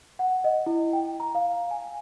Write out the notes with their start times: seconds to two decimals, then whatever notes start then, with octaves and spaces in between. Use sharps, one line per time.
0.19 F#5
0.44 D#5
0.66 E4
0.93 G5
1.20 A#5
1.35 F5
1.71 G#5